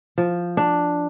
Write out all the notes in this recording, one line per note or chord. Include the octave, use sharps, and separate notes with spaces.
F3
D4